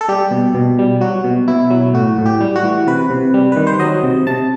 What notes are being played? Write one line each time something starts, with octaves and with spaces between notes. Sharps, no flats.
A4
G3 G4
B2
B2
G3
F#3 F#4
B2
B2 E4
F#3
A2 F#4
A2
G4
G3
F#4
E3
C3 B4
C3
G3
D#3 B4
C5
F#3 D#5
C3
C3 A5